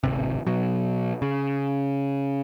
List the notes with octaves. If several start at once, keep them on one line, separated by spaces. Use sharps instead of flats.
D1 G#1 C3
B2 F#3
C#3